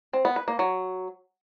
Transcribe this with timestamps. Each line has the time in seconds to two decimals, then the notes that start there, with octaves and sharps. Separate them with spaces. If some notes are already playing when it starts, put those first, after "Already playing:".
0.13 C4
0.25 B3
0.36 B4
0.48 A#3
0.59 F#3